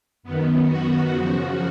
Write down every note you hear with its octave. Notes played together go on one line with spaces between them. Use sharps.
F#2 D#3 B3
F#4
F#2 C#3 F3